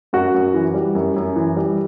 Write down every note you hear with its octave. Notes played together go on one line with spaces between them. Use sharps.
F#2 F#4
F#2
E3
G3
F#2
F#2
E3
G3